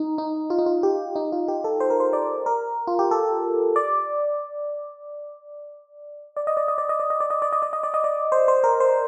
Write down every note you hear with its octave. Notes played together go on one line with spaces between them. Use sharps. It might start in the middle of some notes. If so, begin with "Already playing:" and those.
Already playing: D#4
D#4
F4
D#4
F4
G4
D#4
F4
G4
A4
C5
A#4
C5
D5
A#4
F4
G4
A4
D5
D5
D#5
D5
D#5
D5
D#5
D5
D#5
D5
D#5
D5
D#5
D5
D#5
D5
D#5
D5
C5
C5
A#4
C5